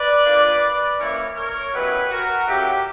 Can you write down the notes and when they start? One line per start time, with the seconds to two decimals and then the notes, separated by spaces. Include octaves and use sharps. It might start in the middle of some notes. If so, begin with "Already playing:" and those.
Already playing: B4 D5
0.25 A#2 A#3 D4
0.99 E3 A#3 C#4 E4 A#4 C#5
1.36 A#4 C#5
1.73 B2 F#3 C#4 E4 G4 B4
2.11 F#4 A#4
2.48 C#3 F#3 C#4 E4 G4